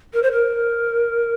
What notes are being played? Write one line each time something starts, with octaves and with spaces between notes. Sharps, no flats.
A#4
C5
A#4